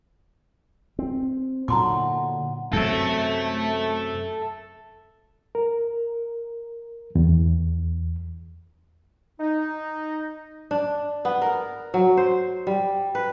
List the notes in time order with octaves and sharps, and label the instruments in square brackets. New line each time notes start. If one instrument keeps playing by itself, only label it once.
[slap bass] C4
[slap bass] A#2 D3 [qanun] F#3 B3 D#4 [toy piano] A#5 C6 D6
[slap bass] F#2 C3 [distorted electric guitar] A4 E5
[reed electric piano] A#4
E2
[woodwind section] D#4
[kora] D4
B3
A#4
F#3
C5
G3
B4